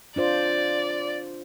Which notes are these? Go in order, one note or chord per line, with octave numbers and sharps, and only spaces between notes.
D4 F4 C5 D5